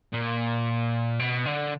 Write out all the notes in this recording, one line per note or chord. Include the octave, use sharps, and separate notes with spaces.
A#2
B2
D3